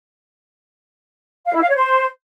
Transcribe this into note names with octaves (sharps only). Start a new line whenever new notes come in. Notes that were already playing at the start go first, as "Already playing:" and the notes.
F5
E4
F5
C#5
C5